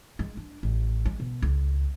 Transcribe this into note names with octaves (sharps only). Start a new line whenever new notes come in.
G#3
D4
A1
G#3
B2
C#2